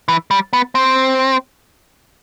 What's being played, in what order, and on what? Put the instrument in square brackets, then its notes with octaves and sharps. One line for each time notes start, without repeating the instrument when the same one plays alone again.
[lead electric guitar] E3
G3
B3
C4